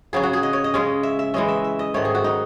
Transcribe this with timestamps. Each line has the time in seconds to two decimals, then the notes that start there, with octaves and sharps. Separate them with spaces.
0.13 C#3 F#3 C#4 G#4
0.23 F#4
0.33 G#4
0.43 D#5
0.53 C#5
0.64 D#5
0.74 C#3 G#3 C#4
1.03 E5
1.19 E5
1.34 E3 G#3 C#4 D#5
1.49 E5
1.64 E5
1.79 D#5
1.94 G#2 D#3 A3 C#5
2.05 G#4
2.15 F#4
2.24 D#4